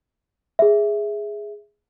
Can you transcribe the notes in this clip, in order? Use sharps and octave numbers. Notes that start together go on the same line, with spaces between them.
G#4 E5